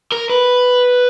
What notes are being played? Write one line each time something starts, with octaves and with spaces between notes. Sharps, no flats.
A#4
B4